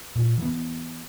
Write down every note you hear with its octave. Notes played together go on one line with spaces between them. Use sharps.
A#2
E3 B3